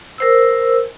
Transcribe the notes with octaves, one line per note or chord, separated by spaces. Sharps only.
A#4 C5 E6